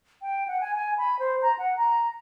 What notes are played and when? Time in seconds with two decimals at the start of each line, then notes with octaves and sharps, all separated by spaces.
0.22 G5
0.48 F#5
0.61 G#5
0.75 G#5
0.98 B5
1.19 C5
1.42 A#5
1.58 F#5
1.76 A#5